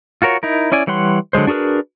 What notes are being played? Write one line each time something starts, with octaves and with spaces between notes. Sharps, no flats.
F4 F#4 A#4 C#5
D#4 E4 A#4
C#4 E4 D5 G#5
E3 G3 C#5 F#5 C6
D3 F#3 G#3 C5
D4 F#4 G#4 A#4 B4